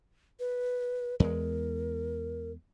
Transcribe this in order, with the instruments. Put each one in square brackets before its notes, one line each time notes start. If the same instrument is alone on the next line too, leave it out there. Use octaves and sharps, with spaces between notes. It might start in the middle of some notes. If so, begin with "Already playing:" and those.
[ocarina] B4
[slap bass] E2 G#3 [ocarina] A#4